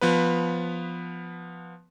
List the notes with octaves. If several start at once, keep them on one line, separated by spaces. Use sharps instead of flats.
F3 B3 B4